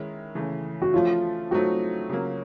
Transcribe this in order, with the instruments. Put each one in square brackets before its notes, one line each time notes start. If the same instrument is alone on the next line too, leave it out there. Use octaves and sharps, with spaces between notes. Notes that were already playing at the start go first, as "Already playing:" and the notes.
Already playing: [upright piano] D#3 G#3 C#4 E4
C#3 E3 A3
[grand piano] F#4
[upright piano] F3 A3 C#4 [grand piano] F4
[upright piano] F#3 A3 C4 D#4 [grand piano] F#4
[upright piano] C#3 F#3 A#3